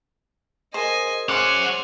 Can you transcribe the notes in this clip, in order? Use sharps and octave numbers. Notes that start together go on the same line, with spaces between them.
G#4 A#4 C5 D#5 G#5
C#4 G#4 C5 F#5 G#5 C6 D6